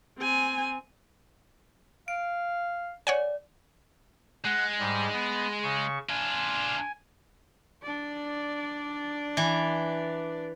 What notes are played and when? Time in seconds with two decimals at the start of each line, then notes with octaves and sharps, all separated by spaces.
0.19 C4 G#5
2.08 F5 D7
3.07 C#5 D5 F#5 G#5
4.44 G#3 F#5 F#6
4.79 G#2 G3
5.13 B3
5.63 C#3 C#6
6.09 D4 F4 G#5
7.83 D4 D5
9.37 E3